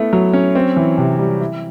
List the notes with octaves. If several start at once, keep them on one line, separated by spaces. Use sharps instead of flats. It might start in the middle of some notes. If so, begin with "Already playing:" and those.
Already playing: A3 B3 E4
F#3
C#4
C4
E3
C3
G3
E4